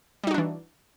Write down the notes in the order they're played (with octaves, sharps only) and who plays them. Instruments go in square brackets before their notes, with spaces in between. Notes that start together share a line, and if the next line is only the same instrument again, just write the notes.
[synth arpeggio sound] G3
D#4
F#4
D4
E3